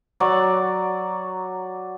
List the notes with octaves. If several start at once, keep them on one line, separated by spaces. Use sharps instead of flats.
F#3 D5 C#6